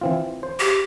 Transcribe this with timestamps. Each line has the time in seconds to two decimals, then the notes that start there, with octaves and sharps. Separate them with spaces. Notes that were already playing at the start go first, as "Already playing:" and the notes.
0.01 E3 C4 F4
0.43 C5
0.59 G4